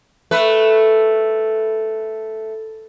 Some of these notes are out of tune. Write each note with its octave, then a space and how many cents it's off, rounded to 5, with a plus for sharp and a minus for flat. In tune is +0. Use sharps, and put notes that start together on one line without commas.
A3 +0 B4 +0